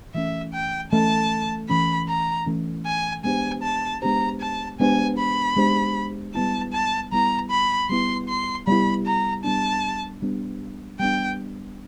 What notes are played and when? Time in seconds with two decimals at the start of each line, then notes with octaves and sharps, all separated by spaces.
0.14 E3 A3 C#4 E5
0.53 G5
0.91 E3 A3 C#4 A5
1.69 E3 A3 C#4 B5
2.09 A#5
2.46 E3 A3 C#4
2.86 G#5
3.24 G#3 B3 D4 G4 C5 G#5
3.63 A5
4.02 G#3 B3 D4 G4 C5 A#5
4.41 A5
4.80 G#3 B3 D4 G4 C5 G#5
5.18 B5
5.56 G#3 B3 D4 G4 C5
6.35 G3 B3 E4 A5
6.73 A5
7.12 G3 B3 E4 A#5
7.51 B5
7.90 G3 B3 E4 C6
8.29 C6
8.67 G3 B3 E4 B5
9.06 A#5
9.44 G3 B3 D4 A5
10.22 G3 B3 D4
11.00 G3 B3 D4 G5